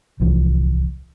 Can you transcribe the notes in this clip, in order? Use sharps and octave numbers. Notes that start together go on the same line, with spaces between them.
D1 C2 E3 F3